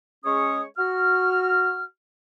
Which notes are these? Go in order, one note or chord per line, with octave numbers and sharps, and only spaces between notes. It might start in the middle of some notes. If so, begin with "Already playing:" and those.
G#3 C#4 G#4 C#5 C#6 D#6
F#4 F6